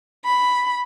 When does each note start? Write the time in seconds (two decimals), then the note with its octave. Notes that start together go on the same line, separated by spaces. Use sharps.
0.25 B5